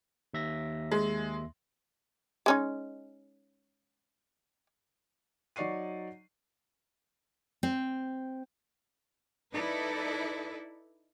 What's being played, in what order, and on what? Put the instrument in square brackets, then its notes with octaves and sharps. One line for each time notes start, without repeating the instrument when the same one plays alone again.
[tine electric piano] D#2 E5 A#6
[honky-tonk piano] G#3
[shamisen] G#3 C#4 D#4
[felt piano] F#3 D#4 D5 C#6 C7 D#7
[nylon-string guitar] C4
[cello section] D#4 E4 A4 B4 D5